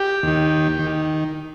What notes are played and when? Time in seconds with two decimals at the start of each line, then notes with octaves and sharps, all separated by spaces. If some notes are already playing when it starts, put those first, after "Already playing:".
Already playing: G4
0.23 D#2 D#3
0.79 D#3